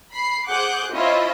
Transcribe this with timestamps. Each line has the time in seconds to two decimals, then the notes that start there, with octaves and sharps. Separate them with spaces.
0.13 B5 C7
0.49 G#4 C5 F#5 D6 F#6 G6
0.93 C#4 E4 F4 C5 D#5 E5